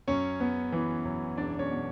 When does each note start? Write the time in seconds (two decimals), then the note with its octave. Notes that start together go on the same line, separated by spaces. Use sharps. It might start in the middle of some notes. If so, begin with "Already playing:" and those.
0.08 F#2 C#4 C#5
0.40 B3
0.72 E3
1.05 F#2
1.37 E1 D4 D5
1.59 C#4 C#5
1.70 B2